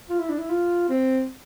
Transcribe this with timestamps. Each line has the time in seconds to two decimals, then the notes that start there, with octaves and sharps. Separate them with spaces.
0.10 F4
0.20 E4
0.29 D4
0.38 E4
0.50 F4
0.89 C4